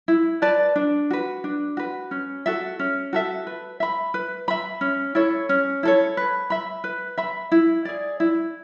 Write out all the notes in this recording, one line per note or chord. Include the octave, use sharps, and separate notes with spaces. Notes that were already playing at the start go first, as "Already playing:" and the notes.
E4
B4 D5 A5
D4
F#4 B4
D4
F#4 B4
C#4
F#4 A4 E5
C#4
F#4 A4 E5
B4
E5 B5
B4
E5 B5
C#4
E4 A4 C#5
C#4
E4 A4 C#5
B4
E5 B5
B4
E5 B5
E4
G#4 D5
E4